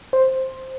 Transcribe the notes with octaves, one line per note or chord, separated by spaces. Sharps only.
C5